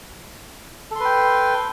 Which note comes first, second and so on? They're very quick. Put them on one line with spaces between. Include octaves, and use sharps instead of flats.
A4 C6 B4 G5